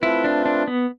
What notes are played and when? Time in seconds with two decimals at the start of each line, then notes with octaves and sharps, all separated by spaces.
0.02 A3 C4 E4 F4 B4
0.24 D4
0.46 D4
0.68 B3